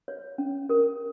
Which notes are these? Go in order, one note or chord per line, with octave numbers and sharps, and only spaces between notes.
C#5
C#4
A#4